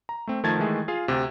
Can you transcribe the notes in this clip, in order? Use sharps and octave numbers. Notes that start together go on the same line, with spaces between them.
A#5
A3 C4
D#3 F3 A3 A5 G#6 A6
D#3 E3 G#3 A3 G#4
F4 G#4 F5
D2 C3